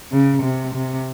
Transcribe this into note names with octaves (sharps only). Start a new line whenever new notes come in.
C#3
C3
C3